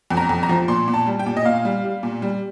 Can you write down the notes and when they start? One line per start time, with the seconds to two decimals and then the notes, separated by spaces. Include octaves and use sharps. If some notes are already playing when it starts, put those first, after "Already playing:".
0.10 F2
0.17 A#5
0.29 F2
0.43 A#5
0.49 F3
0.68 A#2 C6
0.88 A#2
0.94 A5
1.06 G3
1.19 G5
1.26 A#2
1.37 D#5
1.45 A#2 F5
1.65 G3
1.84 G3
2.03 A#2
2.22 G3